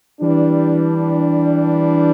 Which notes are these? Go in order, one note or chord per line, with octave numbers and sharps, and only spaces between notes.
E3 G3 D4